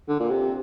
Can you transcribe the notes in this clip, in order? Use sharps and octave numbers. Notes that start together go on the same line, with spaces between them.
D3
A#2
C3